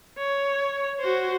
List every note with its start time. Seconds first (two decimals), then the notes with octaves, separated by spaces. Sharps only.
0.18 C#5
1.00 F#4 C5